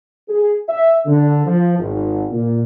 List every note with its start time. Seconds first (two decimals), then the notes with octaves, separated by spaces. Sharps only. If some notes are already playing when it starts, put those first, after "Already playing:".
0.29 G#4
0.68 E5
1.06 D3
1.46 F3
1.78 G#1
2.31 A#2